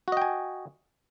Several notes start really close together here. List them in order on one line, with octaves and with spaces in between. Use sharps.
F#4 D#5 G5 G#5